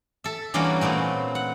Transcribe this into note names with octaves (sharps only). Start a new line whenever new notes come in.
A4 E5
E3 G3 A#3 C#4 D4 F#4
A#2 A3 B3 C4
F#5